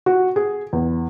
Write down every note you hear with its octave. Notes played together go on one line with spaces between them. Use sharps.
F#4
G#4
E2